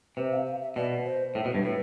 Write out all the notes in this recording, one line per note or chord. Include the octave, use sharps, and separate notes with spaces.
C3 B4
F5
F5
E5
B2 D5
C5
A2
B2
G2
A2 B4